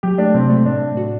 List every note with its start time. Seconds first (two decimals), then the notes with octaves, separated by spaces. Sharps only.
0.03 F#3 G4
0.18 A3 D4
0.34 C3 C4
0.50 A3
0.66 A2 D4
0.81 A2
0.97 F#4